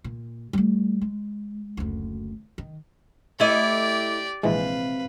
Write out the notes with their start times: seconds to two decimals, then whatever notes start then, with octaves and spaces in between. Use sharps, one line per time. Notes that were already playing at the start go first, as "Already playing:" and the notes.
0.04 A#2
0.53 G3 A3
1.01 G#3
1.77 F#1 D2
2.58 D#3
3.40 A3 E4 G4 D5 D#5
4.43 A#1 C3 E3 G#3 B4 F5